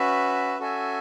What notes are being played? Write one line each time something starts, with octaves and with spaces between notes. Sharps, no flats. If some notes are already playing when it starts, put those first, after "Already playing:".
Already playing: C#4 F#4 B4 E5
C#4 F#4 A4 E5 G#5